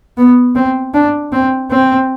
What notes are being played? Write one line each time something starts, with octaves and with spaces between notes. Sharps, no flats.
B3
C4
D4
C4
C4